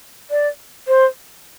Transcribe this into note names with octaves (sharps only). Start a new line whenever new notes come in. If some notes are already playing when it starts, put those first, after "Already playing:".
D5
C5